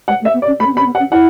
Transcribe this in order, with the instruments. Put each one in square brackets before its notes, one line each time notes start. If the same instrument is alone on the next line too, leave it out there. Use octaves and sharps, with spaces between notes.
[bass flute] G#3 [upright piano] F#5
[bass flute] A3
[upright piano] E5
[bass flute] B3
[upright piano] D5
[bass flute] C#4
[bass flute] A3 [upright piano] B5
[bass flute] C#4
B3
[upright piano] B5
[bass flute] C#4
B3
[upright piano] F#5
[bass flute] C#4
[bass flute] E4 [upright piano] F#5